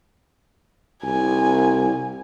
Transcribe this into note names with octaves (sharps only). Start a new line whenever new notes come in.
C2 G#5